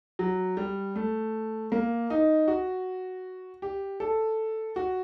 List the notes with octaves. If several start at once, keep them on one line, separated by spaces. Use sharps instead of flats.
F#3
G3
A3
A#3
D#4
F#4
G4
A4
F#4